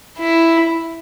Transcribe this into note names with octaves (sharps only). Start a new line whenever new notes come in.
E4